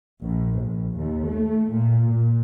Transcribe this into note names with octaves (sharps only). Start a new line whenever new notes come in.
A#1
A#1
D#2
A3
A#2
A#2